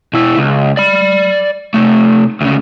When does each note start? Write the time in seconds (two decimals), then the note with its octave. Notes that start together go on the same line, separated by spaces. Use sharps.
0.13 B2 E4
0.38 C#2
0.77 D5 B5
1.74 C3 A3
2.41 D2 C#3